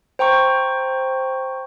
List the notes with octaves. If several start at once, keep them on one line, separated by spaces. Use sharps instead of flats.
C5 G5 A#5 C#6